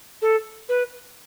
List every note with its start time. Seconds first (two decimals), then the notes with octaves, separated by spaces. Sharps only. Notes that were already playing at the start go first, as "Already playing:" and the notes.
0.22 A4
0.69 B4